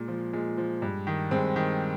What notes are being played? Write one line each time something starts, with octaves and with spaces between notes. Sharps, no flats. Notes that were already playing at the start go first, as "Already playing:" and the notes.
Already playing: A#2 G#3
F3
A#2 G#3
F3
G2
D#3
G2 G#3 C4
D#3